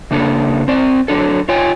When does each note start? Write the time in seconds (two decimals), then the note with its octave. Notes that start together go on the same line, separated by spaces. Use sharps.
0.11 C#3 A#3 D4 A4
0.68 C4 D5
1.08 F#3 D4 A4
1.49 F4 C#5 G5 G#5